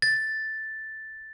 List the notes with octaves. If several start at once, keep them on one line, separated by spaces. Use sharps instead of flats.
A6